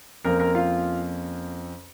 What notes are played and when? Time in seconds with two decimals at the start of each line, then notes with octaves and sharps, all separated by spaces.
0.24 F2 F3 A#3 C#4 A#4 A#5
0.40 A#4 A#5
0.55 F4 F5